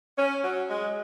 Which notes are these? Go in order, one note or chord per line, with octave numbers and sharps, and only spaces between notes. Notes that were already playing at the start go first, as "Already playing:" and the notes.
C#4
F#3
G#3